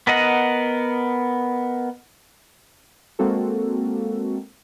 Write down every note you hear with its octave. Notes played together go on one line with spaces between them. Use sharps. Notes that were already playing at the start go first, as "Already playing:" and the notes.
B3 A#4 D#5 F#5
G#3 A#3 C4 F#4 A4